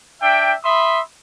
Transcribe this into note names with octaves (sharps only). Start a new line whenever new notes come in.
D4 E5 G5
E5 B5 C6 D#6